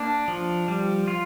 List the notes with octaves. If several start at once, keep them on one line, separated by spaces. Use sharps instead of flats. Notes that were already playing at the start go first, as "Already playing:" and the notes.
Already playing: A#3 D4
F3
G3
F4